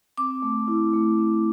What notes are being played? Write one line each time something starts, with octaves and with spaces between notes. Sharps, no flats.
C4 D6
A3
E4
A3
C4